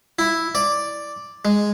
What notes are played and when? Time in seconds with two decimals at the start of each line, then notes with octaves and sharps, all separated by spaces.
0.19 E4
0.55 D5
1.45 G#3